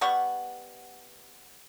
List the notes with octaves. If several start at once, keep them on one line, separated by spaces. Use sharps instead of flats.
G3 B3 F#5 C#6